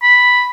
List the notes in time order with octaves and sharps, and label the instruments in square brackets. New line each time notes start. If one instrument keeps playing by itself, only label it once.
[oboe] B5